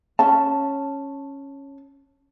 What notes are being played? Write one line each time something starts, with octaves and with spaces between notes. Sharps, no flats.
C#4 A5